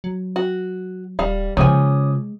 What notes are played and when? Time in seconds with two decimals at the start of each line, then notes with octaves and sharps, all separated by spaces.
0.04 F#3
0.36 F#4
1.19 D#1 G3 F5
1.57 C#3 F3 G#3 C#5 G#5 D6 D#6